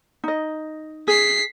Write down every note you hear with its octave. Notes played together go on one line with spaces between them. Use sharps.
D#4 D#5
G#4 B6 C7